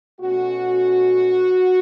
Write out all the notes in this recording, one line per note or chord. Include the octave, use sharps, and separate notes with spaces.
B2 A3 C#4 F#4